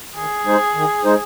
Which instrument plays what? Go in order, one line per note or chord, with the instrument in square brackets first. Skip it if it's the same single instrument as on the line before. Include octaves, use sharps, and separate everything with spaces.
[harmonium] D#3 [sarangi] G#4
[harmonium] G#3 D#4 C5
D#3
G#3 D#4 C5